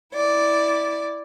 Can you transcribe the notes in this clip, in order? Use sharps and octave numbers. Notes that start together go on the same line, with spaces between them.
E4 D5